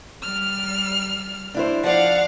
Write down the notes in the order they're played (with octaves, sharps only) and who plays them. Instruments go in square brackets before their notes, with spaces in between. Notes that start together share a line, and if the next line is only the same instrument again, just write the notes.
[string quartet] G3 F6
[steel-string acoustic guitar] D4 E4 C5
[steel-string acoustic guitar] F3 D5 [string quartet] F5 F#5